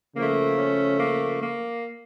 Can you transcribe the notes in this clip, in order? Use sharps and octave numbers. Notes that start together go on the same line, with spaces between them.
C#3 F3 A3 A#3
C#4
A#3
A#3